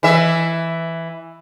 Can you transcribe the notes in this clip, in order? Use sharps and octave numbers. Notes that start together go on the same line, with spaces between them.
E3 E5